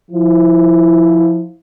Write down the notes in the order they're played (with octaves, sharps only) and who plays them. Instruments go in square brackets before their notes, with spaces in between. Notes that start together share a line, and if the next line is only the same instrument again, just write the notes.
[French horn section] F3 E4